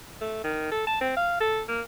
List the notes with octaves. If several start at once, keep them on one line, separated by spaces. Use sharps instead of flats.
A3
D#3
A4
A5
C4
F5
A4
A#3